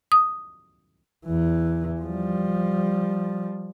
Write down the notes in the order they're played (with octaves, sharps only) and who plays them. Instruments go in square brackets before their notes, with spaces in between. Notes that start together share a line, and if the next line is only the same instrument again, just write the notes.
[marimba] D#6
[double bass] E2 E3
F3 G3